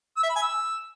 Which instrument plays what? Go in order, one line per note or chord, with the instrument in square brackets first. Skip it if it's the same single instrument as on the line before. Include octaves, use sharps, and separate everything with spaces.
[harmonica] E6
E5
B5
G#5
E6